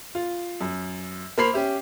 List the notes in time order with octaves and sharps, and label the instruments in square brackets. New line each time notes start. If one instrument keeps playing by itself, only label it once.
[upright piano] F4
F#2
A#3 C5 B5 C7 F7
C#4 G4 E5